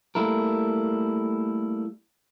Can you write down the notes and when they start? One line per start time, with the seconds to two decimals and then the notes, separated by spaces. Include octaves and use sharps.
0.15 G3 A3 A#3 E4 A4 A#4